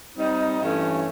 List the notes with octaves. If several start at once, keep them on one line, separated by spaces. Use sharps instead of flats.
G3 C4 D#4
G2 E3 A3 C#4